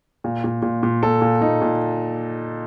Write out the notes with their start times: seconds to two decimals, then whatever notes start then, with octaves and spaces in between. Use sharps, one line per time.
0.24 A#2
0.44 A#2
0.62 A#2
0.83 A#2
1.03 A#2 A4
1.22 A#2
1.41 A#2 D#4
1.62 A#2